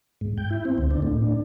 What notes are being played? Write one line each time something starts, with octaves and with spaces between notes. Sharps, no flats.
G#2
G5
E4
C4
D2
D4
A2
D4